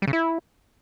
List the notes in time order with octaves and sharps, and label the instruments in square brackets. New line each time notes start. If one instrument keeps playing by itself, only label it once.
[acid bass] G3
C#3
E4